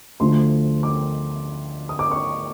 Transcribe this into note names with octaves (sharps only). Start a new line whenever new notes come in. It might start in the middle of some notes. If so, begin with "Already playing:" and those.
D2 D3 F3 A3 C6
D6
D#6
D6
C#6